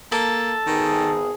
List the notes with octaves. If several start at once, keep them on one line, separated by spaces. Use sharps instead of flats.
A#3 A4
G#1 D#3 B3 G#4